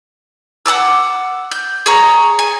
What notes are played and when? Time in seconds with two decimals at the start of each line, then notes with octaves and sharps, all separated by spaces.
0.66 F#5 A5 D6 E6
1.51 G6
1.86 G#4 C#5 A#5
2.39 G#5